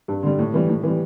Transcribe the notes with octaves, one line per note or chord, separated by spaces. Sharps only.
G2
D3 G3
A2
E3 G3
A2
E3 G3